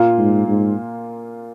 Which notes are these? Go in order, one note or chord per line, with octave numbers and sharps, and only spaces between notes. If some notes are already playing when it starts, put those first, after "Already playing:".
Already playing: A#2 A#3 F4
G#2
G#2